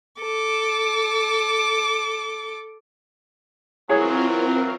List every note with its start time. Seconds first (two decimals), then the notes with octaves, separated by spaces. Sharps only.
0.21 A4 D6
3.89 E3 F#3 C4 E4 F4 G#4 A#4 C#5